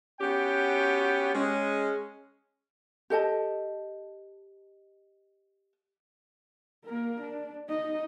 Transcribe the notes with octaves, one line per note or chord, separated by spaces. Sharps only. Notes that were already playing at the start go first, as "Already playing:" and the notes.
B3 C#4 F#4 G4 G5
G#3 C#4
G4 A4 D#5 A5
A#3 A#4
D4
D#4 D#5